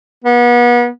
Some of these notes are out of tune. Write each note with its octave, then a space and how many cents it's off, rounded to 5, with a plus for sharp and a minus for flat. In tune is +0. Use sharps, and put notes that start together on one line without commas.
B3 -35